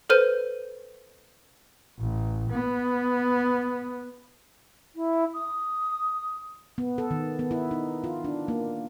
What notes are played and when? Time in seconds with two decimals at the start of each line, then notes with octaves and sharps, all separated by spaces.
0.10 A4 B4 C5 F6 G6 D#7
1.99 A1
2.50 B3
4.95 E4
5.34 D#6
6.78 B3
6.98 A4
7.11 D#3
7.39 B3
7.51 E4
7.71 D#4
8.04 F4
8.24 D4
8.48 A#3